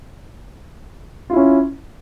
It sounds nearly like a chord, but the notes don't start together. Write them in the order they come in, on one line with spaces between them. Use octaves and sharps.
F4 E4 C#4